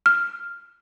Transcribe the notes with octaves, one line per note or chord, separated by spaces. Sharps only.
F6